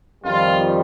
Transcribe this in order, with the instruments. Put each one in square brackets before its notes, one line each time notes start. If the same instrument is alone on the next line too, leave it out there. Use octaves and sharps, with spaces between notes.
[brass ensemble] F2 D#3 G3 F4